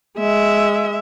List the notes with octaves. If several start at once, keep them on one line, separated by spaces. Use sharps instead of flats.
G#3 E5